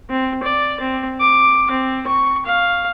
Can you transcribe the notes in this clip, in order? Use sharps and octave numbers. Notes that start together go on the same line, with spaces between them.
C4
D5
C4
D6
C4
C#6
F5